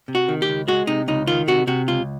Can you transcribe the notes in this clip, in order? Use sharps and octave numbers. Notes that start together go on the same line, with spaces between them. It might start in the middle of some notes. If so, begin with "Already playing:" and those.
C3
F#4
D#3
G4
C#2
G#3 F#4
C3 D#4
C#2 D#4
D#3 F4
C3 F#4
C3 F#4
C#2 F4